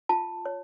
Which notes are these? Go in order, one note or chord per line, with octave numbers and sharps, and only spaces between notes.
F4 A5
C#5